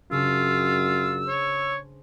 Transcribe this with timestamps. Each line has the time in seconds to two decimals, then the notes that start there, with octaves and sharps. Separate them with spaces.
0.11 F#2 C#3 D4 F4 E6
1.27 C5 C#5